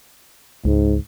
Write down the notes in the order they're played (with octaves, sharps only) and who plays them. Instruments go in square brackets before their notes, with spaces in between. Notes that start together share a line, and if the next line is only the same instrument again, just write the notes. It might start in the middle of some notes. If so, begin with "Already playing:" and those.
[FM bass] C#2 [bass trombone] G#2